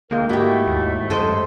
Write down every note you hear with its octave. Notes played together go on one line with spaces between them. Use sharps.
D2 D3 G#3 A#3 F4 A#4 G5
G#2 A3 E4 F#4 G4 D#5
D#2
F#2 G#3 A4 C5 D#5